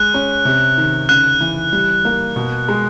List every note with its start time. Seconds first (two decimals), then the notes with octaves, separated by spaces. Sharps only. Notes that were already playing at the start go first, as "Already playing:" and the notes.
Already playing: G#3 F#6
0.14 C#4
0.45 C3
0.78 D#3
1.09 C#3 F#6
1.40 E3
1.73 G3
2.05 A#3
2.36 B2
2.68 G#3